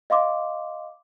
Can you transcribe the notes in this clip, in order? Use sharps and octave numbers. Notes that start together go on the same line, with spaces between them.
D#5 F5 C6 D6